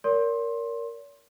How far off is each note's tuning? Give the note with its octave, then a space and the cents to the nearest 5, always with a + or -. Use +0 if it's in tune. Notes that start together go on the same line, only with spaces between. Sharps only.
A#4 +0 C#5 +45 C6 +15